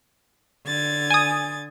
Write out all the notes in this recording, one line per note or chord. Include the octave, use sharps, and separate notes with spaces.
D3 G#6 A6
G#5 D#6